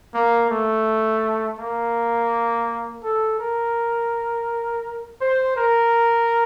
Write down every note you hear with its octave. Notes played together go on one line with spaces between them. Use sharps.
A#3
A3
A#3
A4
A#4
C5
A#4